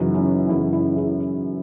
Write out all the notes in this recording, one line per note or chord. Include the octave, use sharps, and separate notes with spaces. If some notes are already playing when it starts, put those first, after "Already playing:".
Already playing: F#2 C#3 E3 D#4 F#4
C#4 E4
F#2 C#3 E3 C#4 E4
C#4 E4
E4 G#4